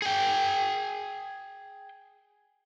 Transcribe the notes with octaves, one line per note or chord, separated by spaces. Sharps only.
G#4 G5